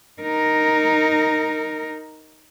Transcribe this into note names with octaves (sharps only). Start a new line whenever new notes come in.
D#4 A#4